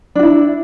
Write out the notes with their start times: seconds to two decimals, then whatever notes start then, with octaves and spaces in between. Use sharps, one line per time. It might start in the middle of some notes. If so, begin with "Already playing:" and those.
0.15 D4
0.19 F#4
0.23 E4